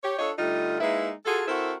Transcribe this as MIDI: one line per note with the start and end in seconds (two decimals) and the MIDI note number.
0.04 0.15 67
0.04 0.15 73
0.19 0.32 62
0.19 0.32 65
0.19 0.32 69
0.19 0.32 73
0.19 0.32 75
0.38 0.80 50
0.38 0.80 55
0.38 0.80 57
0.38 0.80 63
0.38 0.80 65
0.80 1.10 56
0.80 1.10 58
0.80 1.10 63
0.80 1.10 64
0.80 1.10 71
0.80 1.10 76
1.26 1.43 65
1.26 1.43 66
1.26 1.43 68
1.26 1.43 69
1.48 1.73 60
1.48 1.73 64
1.48 1.73 66
1.48 1.73 69
1.48 1.73 70
1.48 1.73 72